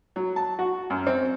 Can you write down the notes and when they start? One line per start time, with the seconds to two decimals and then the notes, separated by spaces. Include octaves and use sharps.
0.16 F#3
0.36 A5
0.59 F#4
0.90 F#2
1.07 C4